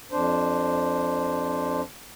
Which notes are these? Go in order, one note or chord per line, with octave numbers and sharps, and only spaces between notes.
F2 D4 C5